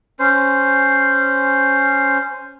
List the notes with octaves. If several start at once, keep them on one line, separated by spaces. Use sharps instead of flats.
C#4 C5